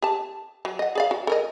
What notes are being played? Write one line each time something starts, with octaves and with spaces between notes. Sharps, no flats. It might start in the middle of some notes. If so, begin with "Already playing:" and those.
G4 A5
F#3
D#5 F#5
G#4 D5 F5
F#4
A4 A#4 D#5